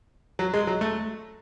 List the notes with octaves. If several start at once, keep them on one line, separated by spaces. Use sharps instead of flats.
F#3
G#3
F#3
A3